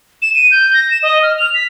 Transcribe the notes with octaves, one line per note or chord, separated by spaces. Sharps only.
E7
D#7
G6
A#6
E7
D#5
F6
F7
B6